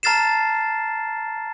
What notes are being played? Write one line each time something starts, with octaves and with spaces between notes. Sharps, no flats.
A5 A#5 F6 A6 C7 E7